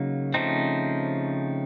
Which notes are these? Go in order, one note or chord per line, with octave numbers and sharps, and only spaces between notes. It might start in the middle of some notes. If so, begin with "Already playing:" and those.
Already playing: C#3 F#3 A#3 D#4
C#3 F3 A3 C4 D#4